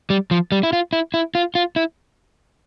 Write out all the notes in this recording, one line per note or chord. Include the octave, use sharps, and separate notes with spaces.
G3
F3
G3
E4
F4
E4
E4
F4
F4
E4